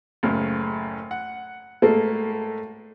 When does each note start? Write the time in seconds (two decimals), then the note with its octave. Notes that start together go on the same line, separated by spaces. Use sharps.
0.23 F#1 A2 C#3
1.11 F#5
1.82 A2 G#3 A#3 A4